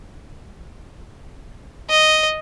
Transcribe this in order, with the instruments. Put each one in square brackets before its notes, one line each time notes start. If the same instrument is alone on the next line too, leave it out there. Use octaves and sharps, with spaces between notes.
[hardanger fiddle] D#5